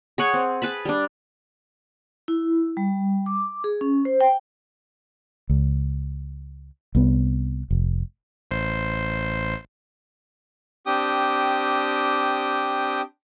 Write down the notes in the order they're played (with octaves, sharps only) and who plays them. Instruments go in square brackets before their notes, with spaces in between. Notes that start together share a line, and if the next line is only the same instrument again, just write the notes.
[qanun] G#4 C#5 F#5 G#5
C4
G#4 B4 A5 B5
G3 D4
[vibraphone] E4
G3
D6
G#4
C#4
C5
G5
[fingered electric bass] C#2
C2 B3
F1
[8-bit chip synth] A1 C5 C7
[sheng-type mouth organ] C4 D4 G4 G5 D#6